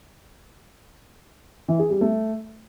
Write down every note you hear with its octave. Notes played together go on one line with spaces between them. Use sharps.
E3
G#4
G3
A3